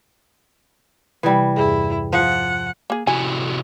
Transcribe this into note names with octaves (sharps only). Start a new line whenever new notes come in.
C3 E3 G3
E2 G2 E4 G#4
F3 F#5
A#3 G#4
C3 E4 F#4 G#5